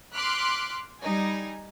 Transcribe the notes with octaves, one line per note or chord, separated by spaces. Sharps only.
C6 D6 F6 F#6 B6
G3 D#4 G#5